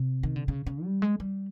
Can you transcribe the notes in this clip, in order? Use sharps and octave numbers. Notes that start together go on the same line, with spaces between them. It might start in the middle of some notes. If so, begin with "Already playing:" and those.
Already playing: C3
D#3
D3
C#3
C#3
G3
G#3
G3